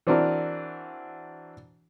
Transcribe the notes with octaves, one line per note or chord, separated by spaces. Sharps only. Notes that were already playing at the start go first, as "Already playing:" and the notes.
E3 C4 D4 F#4 A#4